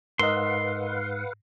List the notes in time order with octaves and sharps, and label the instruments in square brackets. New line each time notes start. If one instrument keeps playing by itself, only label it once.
[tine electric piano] G#2 E6 [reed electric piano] A#4 D#5 [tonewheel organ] B4 F5 F#5 [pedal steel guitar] C6